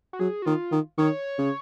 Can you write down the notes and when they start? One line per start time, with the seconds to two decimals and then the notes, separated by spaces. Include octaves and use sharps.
0.13 F#4
0.20 F#3 G#4
0.42 F#4
0.45 D#3 F4
0.72 D#3
0.98 D#3 C#5
1.38 C#3